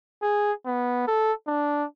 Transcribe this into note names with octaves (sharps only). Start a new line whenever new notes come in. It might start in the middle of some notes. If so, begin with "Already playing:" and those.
G#4
B3
A4
D4